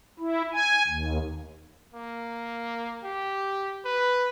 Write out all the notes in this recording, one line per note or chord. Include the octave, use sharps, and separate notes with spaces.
E4
G#5
D#2
A#3
G4
B4